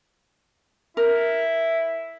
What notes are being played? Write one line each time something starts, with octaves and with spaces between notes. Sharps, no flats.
E4 A#4